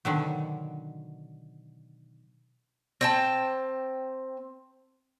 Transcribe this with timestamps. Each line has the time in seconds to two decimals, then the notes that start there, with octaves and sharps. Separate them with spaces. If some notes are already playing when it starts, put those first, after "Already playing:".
0.05 B2 D3 D#3 F#3
3.01 C4 G5 A5